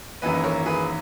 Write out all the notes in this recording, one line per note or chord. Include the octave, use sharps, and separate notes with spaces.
G#1 F#2 E3 A#3 B4 D#5
A#4 C#5
G#4 B4